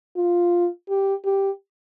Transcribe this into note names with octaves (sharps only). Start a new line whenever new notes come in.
F4
G4
G4